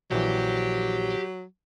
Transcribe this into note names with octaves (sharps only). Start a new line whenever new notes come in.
A#1 E3 F#3 G4